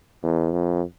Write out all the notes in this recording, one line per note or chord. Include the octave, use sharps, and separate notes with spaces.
E2
F2